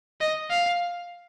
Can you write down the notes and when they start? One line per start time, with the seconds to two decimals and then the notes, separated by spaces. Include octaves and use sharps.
0.21 D#5
0.50 F5